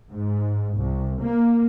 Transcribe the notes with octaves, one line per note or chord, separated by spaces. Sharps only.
G#2
C2
A#3